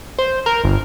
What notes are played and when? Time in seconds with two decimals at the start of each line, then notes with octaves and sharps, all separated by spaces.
0.19 C5
0.46 A#4
0.64 G1